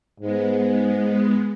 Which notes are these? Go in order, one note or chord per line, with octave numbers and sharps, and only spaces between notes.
G#2 G#3 B3